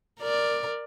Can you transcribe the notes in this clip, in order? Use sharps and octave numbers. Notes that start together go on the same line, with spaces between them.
A#4 D5